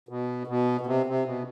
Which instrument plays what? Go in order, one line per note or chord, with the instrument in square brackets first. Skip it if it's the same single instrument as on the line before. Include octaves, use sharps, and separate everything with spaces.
[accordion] B2
B2
B2
C3
C3
B2